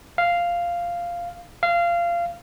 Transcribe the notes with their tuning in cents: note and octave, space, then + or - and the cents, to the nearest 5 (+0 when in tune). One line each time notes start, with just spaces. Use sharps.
F5 -5
F5 -20